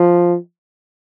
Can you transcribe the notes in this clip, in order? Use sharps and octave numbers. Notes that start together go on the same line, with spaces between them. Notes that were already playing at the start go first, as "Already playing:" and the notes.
Already playing: F3